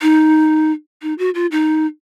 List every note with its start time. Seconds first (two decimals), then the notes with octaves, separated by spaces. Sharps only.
0.02 D#4
1.02 D#4
1.19 F#4
1.35 F4
1.52 D#4